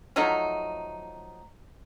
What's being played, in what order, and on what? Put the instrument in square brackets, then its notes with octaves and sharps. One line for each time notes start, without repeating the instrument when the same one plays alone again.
[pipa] F3 F#3 A3 D#4